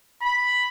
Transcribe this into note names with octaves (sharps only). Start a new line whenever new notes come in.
B5